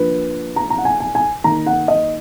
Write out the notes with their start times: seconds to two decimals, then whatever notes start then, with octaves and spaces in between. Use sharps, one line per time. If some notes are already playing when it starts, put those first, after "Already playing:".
Already playing: F3 A#3 D4 B4
0.56 A#5
0.70 A#5
0.78 F#5
0.85 G#5
1.00 G#5
1.15 G#5
1.44 D#3 A#3 D#4 A#5
1.66 F#5
1.88 D#5